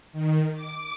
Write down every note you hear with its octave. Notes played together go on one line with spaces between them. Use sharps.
D#3
D6